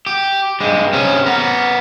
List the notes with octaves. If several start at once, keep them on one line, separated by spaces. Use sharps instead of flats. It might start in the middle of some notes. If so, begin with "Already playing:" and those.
G4
G2 G#3
C3 C#4
B3 A#4